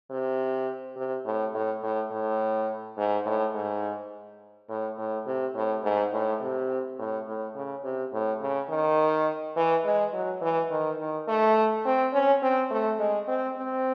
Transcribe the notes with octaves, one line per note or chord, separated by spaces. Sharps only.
C3
C3
A2
A2
A2
A2
G#2
A2
G#2
A2
A2
C3
A2
G#2
A2
C3
A2
A2
C#3
C3
A2
C#3
D#3
E3
G#3
F#3
E3
D#3
D#3
A3
C4
C#4
C4
A3
G#3
C4
C4